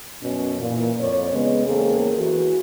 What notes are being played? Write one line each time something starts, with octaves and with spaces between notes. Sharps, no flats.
F#2 B2 C#4
A#2 E3
F2 C#5 D5
C#3 G#3 B3
E2 A#3 C4 C#4 G#4 A4
E3 F#4